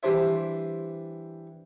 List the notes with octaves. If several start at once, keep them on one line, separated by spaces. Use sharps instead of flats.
E3 G3 D4 C5 E5